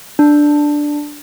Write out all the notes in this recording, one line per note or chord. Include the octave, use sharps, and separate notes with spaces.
D4